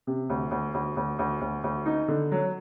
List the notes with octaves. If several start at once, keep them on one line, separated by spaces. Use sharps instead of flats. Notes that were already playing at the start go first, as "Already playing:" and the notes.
C3
D2
D2
D2
D2
D2
D2
D2
D#4
D3
F#3